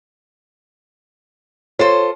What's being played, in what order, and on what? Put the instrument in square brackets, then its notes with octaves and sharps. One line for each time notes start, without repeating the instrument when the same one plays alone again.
[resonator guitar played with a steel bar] F4 A4 C5 [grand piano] C#5